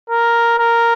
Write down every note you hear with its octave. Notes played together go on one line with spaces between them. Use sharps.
A#4
A#4